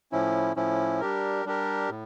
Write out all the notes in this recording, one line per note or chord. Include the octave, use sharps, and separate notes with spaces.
A2 F3 C#4 E4
A2 F3 C#4 E4
G3 D4 G4 A#4
G3 D4 G4 A#4
A2